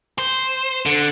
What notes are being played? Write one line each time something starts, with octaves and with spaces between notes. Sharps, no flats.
C5
D3